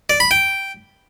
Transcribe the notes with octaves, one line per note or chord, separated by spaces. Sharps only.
D5
B5
G5